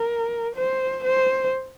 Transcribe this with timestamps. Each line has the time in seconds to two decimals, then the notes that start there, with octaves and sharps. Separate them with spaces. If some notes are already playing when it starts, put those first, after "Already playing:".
Already playing: A#4
0.56 C5
1.05 C5